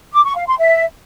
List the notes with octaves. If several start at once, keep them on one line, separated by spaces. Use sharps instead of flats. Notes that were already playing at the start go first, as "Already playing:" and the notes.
D6
C#6
F5
C6
E5